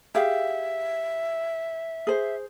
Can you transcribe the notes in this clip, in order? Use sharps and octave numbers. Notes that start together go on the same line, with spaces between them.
G4 G#4 E5 F5
G#4 C5